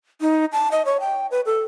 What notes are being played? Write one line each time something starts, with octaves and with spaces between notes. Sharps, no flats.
D#4
A5
D#5
C#5
G5
B4
A4